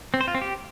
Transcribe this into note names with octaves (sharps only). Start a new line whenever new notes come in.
C4
C5
F4
C4
G4